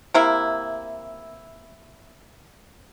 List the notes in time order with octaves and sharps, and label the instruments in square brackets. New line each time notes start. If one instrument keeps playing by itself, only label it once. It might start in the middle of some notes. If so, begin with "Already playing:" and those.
[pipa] C3 A#3 E4